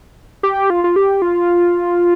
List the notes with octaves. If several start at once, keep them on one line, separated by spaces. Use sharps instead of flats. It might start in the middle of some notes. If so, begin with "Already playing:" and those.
G4
F4
F4
G4
F4